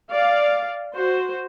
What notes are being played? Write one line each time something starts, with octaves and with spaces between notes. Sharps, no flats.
D5 F5
F#4 C5